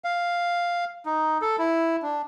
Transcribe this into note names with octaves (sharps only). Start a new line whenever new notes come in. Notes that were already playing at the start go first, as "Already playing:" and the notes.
F5
D#4
A4
E4
D4